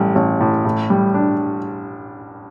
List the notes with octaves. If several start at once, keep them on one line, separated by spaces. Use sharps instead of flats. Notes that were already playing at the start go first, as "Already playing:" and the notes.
Already playing: A1 G3
A1
A2
A2
G3
D4